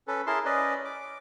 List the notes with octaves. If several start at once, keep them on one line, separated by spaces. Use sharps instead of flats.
C#4 A4 B4
E4 G#4 A#4 A5 C6
C#4 B4 D5 D#5
D6